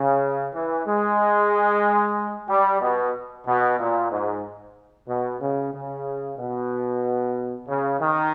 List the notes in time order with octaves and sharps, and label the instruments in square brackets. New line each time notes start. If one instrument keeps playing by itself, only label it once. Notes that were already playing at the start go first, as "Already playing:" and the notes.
Already playing: [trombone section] C#3
E3
G#3
G3
B2
B2
A#2
G#2
B2
C#3
C#3
B2
C#3
D#3